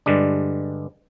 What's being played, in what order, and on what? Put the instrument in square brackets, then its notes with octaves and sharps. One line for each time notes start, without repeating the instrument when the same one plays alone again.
[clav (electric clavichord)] G2 D3 G3 G#3 D4